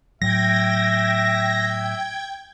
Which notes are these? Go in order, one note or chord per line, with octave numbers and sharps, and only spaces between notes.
A2 F#3 E5 G5 G#6 A#6